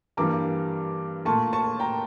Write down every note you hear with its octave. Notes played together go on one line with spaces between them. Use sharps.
G2 E3 G3 A#3 A#5 D6
A#2 A3 A5 C#6
A5 C#6
G5 A#5